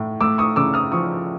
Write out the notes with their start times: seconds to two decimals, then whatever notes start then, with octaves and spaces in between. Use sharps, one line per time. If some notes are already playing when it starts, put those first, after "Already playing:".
Already playing: A2
0.21 A3 D6 E6
0.38 C#6 D#6
0.56 C#3 D6 E6
0.74 D#6 F6
0.92 F3 C#6 D#6